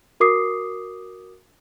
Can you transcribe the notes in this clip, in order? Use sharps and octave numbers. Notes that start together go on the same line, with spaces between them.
F#4 A#4 D6 D#6 C7